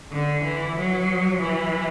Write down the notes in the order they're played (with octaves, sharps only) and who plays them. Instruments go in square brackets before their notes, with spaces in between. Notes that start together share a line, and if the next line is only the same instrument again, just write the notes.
[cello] D3
E3
F#3
E3